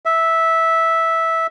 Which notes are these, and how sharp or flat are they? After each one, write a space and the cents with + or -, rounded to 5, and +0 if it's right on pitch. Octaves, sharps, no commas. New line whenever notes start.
E5 -10